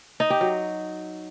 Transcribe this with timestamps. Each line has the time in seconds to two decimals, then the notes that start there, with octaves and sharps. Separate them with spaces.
0.20 D#4
0.30 G4
0.41 F#3